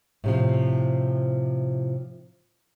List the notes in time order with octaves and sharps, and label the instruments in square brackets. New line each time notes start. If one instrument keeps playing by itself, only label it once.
[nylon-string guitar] A2 C3 F3